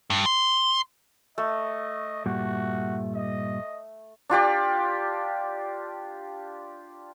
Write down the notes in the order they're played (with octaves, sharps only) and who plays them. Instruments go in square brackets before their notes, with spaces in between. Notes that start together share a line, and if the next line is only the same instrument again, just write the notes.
[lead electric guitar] G2
C6
[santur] A3 [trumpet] D#5
[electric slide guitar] G2 A#2 G3 [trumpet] F#4
[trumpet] D#5
[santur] D4 F4 G4 D5